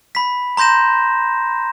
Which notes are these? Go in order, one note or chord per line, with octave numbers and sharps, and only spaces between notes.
B5 B6
A#5 C6 G6 A#6 E7